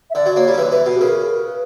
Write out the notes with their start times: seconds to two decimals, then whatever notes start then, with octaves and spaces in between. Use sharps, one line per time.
0.10 E5
0.15 D3 D5
0.26 F#3
0.36 A#3 C#5
0.47 G3
0.54 D3
0.58 E3 B4
0.72 E3
0.86 B2
0.95 G4
1.01 C#3 A#4
1.22 A#4
1.44 B4